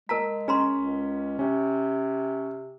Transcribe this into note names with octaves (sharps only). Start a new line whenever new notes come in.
G#3 A#4 A5 A#5 B6
C#4 G#4 A#5 C6
C#2
C3 C#4